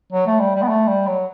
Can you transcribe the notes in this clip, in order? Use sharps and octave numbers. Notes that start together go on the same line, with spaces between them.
F#3
A3
G3
G3
B3
A3
G3
F#3